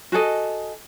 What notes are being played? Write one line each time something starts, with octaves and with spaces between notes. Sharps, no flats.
F#4 G#4 A4 D#5